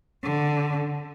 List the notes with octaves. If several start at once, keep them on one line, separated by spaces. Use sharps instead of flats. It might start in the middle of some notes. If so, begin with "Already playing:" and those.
D3